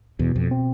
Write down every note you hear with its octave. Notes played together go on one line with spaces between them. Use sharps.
E2 B2
F2
C4